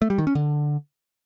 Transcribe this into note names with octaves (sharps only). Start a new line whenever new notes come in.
A3
G3
D#3
C#4
D3